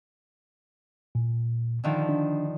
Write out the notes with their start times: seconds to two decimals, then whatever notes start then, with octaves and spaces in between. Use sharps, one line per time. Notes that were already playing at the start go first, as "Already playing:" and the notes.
1.15 A#2
1.84 D3 D#3 F3
2.09 D4